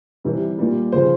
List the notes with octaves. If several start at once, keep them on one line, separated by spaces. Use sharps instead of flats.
C3 E3 G3
A#2 G3
C#3 F3 C5